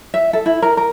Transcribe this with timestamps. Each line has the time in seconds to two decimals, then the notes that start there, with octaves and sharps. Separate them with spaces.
0.14 E5
0.33 A4
0.46 E4
0.62 A#4
0.77 A#4